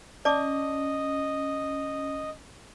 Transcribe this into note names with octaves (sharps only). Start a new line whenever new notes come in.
C#4 D5 D#5 A5 D6